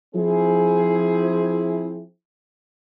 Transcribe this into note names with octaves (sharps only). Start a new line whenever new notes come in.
F3 C4 E4 G#4